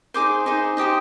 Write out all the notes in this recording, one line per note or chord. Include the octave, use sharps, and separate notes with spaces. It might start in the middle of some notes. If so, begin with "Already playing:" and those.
D#4 G#4 C5 D6
D#4 G#4 C5
D#4 G4 C5 D#6